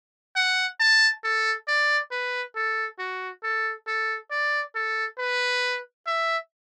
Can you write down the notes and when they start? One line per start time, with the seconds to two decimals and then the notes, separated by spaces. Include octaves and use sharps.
0.36 F#5
0.80 A5
1.24 A4
1.68 D5
2.12 B4
2.56 A4
2.99 F#4
3.43 A4
3.87 A4
4.31 D5
4.75 A4
5.19 B4
6.07 E5